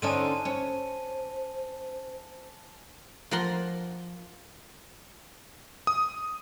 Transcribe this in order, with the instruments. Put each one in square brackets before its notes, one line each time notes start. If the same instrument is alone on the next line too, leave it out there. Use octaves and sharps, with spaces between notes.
[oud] D3 C#4 D#4 [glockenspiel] G#5 A5 D#7 [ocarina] C6
[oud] C#4 [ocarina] C5
[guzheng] F3 A#3 F#5 A#5 C6
[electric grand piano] D#6